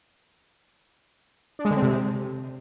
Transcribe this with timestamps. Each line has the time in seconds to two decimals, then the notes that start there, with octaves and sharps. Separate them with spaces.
1.59 D4
1.65 G#3
1.71 D3
1.76 C4
1.82 C3